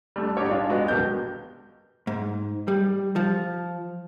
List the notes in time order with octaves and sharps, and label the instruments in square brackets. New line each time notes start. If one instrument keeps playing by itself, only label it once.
[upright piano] G3 A3 D4
A#1 G#2 G4 C#5
G#3 D4 D#4 F4
F#3 G#3 B3 F#4
D#1 A#1 B2 A#3 G6
[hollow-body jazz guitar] G#2
G3
F3